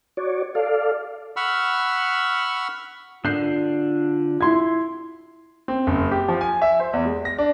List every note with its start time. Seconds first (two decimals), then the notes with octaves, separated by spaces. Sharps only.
0.17 F#4 C#5 D5
0.55 A4 D5 F5
1.36 F#5 B5 C#6 E6 F6
3.25 D3 D4 F4 G6 C7
4.41 E4 C6 G#6
5.68 C4
5.87 F#1
6.11 G4
6.28 F3
6.41 G#5
6.62 E5
6.80 C5
6.93 E2
7.05 G#3
7.25 A#6
7.38 D4